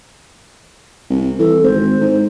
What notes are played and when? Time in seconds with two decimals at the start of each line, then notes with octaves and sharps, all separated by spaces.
1.10 C2
1.38 E3 A4
1.63 G#1 C5
2.01 G#2